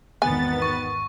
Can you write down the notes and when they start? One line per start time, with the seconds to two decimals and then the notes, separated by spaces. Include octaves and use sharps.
0.22 G#1 E2 D#3 B3 G#5 A6
0.62 C#6